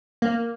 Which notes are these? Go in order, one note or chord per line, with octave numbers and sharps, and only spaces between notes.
A#3